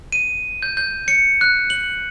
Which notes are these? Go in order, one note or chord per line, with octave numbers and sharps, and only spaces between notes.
D#7
G6
G6
C#7
F#6
F#7